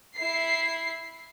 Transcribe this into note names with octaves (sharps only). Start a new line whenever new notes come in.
E4 C7